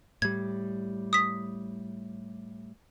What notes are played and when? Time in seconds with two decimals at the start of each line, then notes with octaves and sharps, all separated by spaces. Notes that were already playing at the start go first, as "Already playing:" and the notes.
0.22 A2 G3 G#6
1.13 D#6 B6